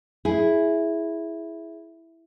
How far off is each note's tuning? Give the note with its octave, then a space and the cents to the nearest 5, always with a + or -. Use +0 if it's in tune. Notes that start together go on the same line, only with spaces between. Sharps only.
E4 +0 G#4 +10